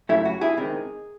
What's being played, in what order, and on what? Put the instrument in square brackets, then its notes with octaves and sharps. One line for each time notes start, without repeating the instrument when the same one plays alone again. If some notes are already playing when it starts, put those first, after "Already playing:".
[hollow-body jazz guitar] F#2 C#3 F#3 A3 E4
F#4
E4 G#4
C3 D#3 G#3 C4 D#4